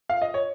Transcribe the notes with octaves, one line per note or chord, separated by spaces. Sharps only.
F5
D#5
C#5